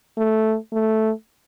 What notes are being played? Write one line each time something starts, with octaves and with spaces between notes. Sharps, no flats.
A3
A3